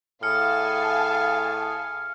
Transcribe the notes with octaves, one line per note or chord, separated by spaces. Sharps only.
A2 G#4 F5 G#5 A5 F6 C#7